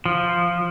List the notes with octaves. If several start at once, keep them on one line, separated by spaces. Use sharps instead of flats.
F3